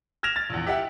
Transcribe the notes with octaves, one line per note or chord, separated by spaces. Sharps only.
F6 G#6 A#6 E7 F7
A6
A#1 E2
G4 E5 F#5